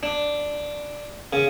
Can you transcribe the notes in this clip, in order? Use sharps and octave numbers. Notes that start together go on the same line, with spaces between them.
D4
C#3